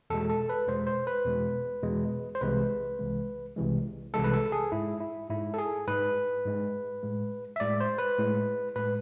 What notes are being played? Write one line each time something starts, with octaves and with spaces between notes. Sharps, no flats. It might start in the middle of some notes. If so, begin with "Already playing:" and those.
E2 B2 G#3 A4
A4
B4
E2 B2 G#3 C5
C5
B4
E2 B2 G#3
E2 B2 G#3
C5
C2 C3 E3 G#3 B4
C2 C3 E3 G#3
C2 C3 E3 G#3
C2 C3 E3 G#3 A4
B4
A4
G#4
G#2 G#3 E4
E4
G#2 G#3 E4
A4
G#4
G#2 G#3 B4
G#2 G#3
A2 G#3
E5
A2 G#3 D5
C5
B4
A2 G#3
A2 G#3 B4